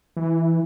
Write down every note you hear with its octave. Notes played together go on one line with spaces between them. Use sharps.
E3